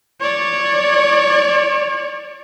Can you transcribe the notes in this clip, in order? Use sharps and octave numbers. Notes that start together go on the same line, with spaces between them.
C#5 D5